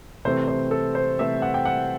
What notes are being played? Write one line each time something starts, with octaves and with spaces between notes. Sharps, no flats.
C3 E3 A3 C4 C5
C5
A4
C5
C3 E3 A3 C4 E5
F#5
G5
F#5